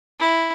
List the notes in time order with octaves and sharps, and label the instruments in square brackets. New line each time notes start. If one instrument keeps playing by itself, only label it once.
[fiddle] E4